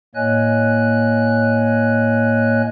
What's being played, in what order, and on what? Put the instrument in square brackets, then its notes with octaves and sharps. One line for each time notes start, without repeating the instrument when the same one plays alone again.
[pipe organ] A2 A#3 C#5 D#5 G#5 F#6